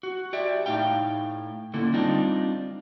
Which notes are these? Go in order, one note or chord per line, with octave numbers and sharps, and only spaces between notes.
F#4
G4 D5 E5
A2 D#4 F5 G5
D3 A#3 C#4 E4 A4
G3 C4 D4 D#4 F4